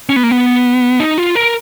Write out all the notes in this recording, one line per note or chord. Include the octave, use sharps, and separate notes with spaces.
C#4
B3
A#3
B3
D#4
F4
A#4